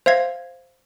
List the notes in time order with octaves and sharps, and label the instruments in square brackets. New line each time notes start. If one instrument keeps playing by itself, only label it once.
[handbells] C5 E5 F5 G#6 A#6